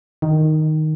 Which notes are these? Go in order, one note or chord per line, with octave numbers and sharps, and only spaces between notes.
D#3